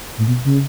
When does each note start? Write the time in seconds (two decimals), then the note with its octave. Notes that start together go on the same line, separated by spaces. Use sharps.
0.18 A2
0.27 B2
0.45 C#3